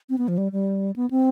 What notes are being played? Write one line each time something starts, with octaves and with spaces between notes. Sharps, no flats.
C4
B3
F3
G3
G3
B3
C4